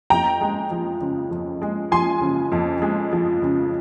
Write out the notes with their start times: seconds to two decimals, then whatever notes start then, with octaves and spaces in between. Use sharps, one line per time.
0.10 F2 G5 A#5
0.41 G#3
0.71 F3
1.01 C#3
1.31 F2
1.62 G#3
1.91 F3 G#5 C6
2.21 C#3
2.52 F2
2.82 G#3
3.13 F3
3.42 C#3